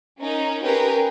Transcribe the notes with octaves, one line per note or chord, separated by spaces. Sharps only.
C#4 D#4 A#4
C#4 G4 G#4 A#4 B4